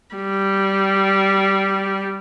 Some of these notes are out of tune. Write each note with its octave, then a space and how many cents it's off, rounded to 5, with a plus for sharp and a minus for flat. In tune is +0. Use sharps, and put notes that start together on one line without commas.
G3 -10